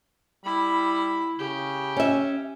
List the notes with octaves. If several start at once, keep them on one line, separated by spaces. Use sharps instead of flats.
G3 E4 B5
C#3 G4
C#4 E5